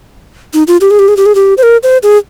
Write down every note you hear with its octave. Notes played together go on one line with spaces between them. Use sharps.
D#4
F4
G4
G#4
G4
G#4
G4
G#4
G4
C5
A#4
C5
G#4